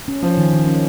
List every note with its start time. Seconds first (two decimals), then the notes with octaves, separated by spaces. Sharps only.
0.08 C#4
0.22 F3 C#4
0.38 D#3
0.53 D#3
0.68 C#4